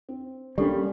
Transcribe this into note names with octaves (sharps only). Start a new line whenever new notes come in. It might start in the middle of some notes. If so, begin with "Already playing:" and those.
C4
G3 A#3 C#4 D4 G4 A4 C#6